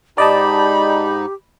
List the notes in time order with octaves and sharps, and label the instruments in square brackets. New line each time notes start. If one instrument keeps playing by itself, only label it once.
[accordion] G#2 D#4 [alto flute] G4 [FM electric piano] D5 D#5 A5 [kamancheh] B5